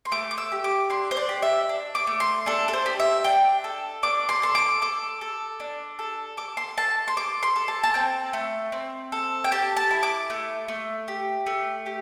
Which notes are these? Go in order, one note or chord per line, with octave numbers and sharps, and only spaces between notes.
C6
A3 D6
D6
E6
G4
D6
D4 C6
C5
D5
G4
E5
D4
D6
A3
C6
D4 A4
A4
C5
G4
E5
D4 G5
A4
D4 D6
C6
A4 C6
D6
A4 D6
A4
D4
A4
A4 D6
C6
A4 A5
C6
A4 D6
C6
A4
A5
A5
C4 G5
A3
C4
A4
G5
G4 A5
A5
E4
D6
A3
A3
G4
A3
G4